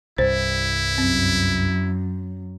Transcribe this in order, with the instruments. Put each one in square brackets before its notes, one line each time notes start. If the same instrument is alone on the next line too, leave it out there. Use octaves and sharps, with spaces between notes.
[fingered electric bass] C2 G2 [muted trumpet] E4 [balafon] C5
[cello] F#2 [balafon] C4